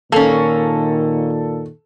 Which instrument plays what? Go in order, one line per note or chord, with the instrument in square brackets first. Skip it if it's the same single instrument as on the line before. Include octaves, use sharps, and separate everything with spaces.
[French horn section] A#2 D#3 [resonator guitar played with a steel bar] A#3 C#4 [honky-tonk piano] A4